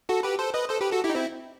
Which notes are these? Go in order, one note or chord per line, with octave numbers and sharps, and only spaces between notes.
F#4 A4
G4 B4
A4 C5
B4 D#5
A4 C5
G4 B4
F#4 A4
E4 G4
D#4
C4 E4